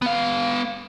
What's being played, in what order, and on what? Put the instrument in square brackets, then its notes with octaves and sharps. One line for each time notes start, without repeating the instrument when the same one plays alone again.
[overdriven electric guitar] B3 F5